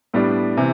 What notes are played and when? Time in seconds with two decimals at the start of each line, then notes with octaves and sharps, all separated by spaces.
0.14 A2 G3 B3 D4
0.57 C3 E3